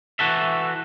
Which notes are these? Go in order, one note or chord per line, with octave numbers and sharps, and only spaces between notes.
E3 F#4 A4 E5